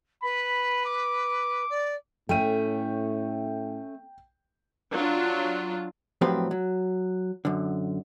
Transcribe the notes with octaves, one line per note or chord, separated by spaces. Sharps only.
B4 B5
D6
D5
A2 A3 C#4 G5 D#7
F#3 D4 F4
A2 F3 F#3 C4 G4 B4
F#3
F#2 D3